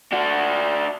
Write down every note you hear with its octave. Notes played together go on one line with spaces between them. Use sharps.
D4 F#4